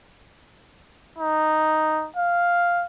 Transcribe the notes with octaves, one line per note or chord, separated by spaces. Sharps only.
D#4
F5